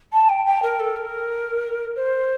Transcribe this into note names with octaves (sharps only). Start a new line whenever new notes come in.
A5
G5
G5
A#4
A4
A#4
C5